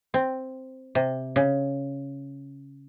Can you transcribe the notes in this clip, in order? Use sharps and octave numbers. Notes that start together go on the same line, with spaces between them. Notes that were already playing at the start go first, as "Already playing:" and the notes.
C4
C3
C#3